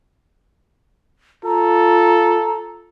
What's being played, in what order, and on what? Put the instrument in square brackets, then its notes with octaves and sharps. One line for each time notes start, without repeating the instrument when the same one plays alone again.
[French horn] F4 [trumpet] A4 [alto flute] A#5